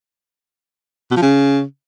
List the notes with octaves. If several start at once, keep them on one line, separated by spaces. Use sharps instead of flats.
B2
F3
C#3